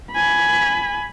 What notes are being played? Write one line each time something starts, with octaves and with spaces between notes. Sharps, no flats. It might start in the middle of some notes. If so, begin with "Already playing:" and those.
G#5 B5